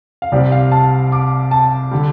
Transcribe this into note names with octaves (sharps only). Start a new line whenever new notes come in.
F5
C2 C3 G3 C4 D5
F5
A5
D6
A5
D3 G3